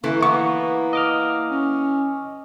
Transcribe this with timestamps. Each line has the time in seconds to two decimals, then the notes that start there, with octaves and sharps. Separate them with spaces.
0.04 E3 A3 A#3
0.22 E3 B3 C#6
0.93 D#5 D6 F6
1.50 C#4